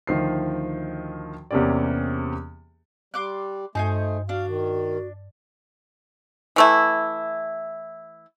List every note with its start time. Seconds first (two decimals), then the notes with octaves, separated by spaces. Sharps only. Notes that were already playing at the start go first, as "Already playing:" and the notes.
0.07 D2 D#3 F3 C7
1.51 E2 C3 A#3 C#4 G4 D5
3.14 G3 C6 D6 F#6
3.75 G2 A3 D#4 C5 G#5
4.29 D4 F#4 F5
4.48 D#3
6.56 E3 A3 E4